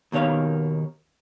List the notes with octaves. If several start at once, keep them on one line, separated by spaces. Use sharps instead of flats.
D#2 B2 D#3 C#5 F5